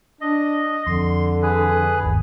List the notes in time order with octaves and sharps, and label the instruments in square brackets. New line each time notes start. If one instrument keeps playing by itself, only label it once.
[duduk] D4 [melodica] D#5
[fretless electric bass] F2 [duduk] D3 [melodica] C6
[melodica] G#4 B4
[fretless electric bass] G1 D#2